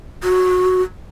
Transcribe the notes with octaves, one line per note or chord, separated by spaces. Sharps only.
F#4